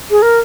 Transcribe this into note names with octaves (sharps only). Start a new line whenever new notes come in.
G#4
A#4